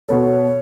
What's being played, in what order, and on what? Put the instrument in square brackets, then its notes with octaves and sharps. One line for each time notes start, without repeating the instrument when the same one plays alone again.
[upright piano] B2 B3 A4 [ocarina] C#5